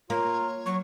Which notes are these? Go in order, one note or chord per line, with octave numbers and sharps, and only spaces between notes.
A#3 F4 C#5 A#5
F#3 C#6